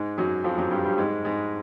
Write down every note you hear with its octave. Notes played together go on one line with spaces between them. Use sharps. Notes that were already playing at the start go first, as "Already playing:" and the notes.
Already playing: G#2 G#3
F#2 F#3
F2 F3
F#2 F#3
G2 G3
G2 G3
G#2 G#3
G#2 G#3